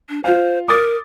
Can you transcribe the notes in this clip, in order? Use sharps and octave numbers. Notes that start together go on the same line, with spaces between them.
D4
F4 C5 F5
A#4 D6 D#6 A6